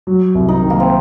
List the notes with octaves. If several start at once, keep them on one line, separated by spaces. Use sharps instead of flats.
F#3
C2
D#4
D#3
A#3
C4